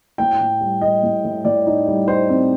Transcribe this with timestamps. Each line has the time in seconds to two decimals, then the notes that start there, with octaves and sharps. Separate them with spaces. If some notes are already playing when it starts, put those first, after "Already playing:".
0.18 A2 G5
0.40 A2
0.61 G3
0.81 G3 D#5
1.03 A2
1.24 A2
1.45 A2 D5
1.67 D#4
1.88 G3
2.08 D#4 C5
2.29 C4